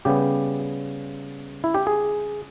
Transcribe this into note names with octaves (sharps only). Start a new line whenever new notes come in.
C#3 G3 B3 G4
E4
G4
G#4